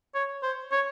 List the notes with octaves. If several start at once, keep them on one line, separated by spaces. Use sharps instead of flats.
C#5
C5
C#5